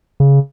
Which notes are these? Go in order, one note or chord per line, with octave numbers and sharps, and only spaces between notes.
C#3